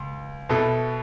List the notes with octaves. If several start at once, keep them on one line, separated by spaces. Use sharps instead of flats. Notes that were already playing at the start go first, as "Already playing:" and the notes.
Already playing: C#2
B2 B3 E4 A4